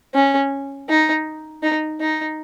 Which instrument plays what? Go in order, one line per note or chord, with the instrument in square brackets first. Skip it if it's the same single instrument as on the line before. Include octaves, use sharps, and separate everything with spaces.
[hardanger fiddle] C#4
D#4
D#4
D#4